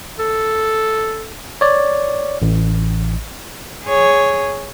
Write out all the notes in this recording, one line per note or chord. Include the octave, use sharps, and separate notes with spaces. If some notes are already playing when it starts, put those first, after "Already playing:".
A4
C#5 D5
A1
G#4 C#5